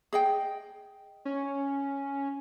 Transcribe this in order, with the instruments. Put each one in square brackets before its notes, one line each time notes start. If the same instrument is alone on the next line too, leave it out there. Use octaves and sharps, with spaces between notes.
[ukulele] G#4 D#5 G5
[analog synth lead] C#4